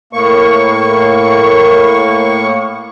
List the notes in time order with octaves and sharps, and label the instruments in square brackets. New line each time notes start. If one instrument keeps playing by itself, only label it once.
[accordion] A2 A#3 C#6